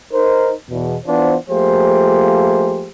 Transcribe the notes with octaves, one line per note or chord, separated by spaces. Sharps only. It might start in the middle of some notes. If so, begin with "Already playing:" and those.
D#4 A#4 C5
E2 B2
E3 B3 D4 F4 C5
F3 A3 A#3 G4 G#4 C5